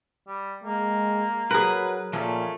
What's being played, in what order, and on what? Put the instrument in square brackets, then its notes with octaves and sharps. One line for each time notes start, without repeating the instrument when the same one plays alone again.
[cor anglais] G3
[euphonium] G#3 [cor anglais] A#3
[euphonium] F#3 [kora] G#4 A#4 [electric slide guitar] B4
[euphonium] A#2 [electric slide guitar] F3 A#3 C#4 [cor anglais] A3